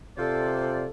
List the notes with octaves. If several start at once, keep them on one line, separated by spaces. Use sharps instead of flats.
C3 F4 A4 C5 D5